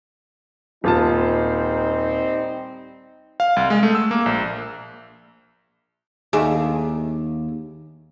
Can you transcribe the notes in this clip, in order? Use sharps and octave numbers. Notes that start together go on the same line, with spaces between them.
D#1 G3 C4 D#4 F4 A5
F5
C2
G#3
A3
E6
A#3
A#1
D#2 G#4 E5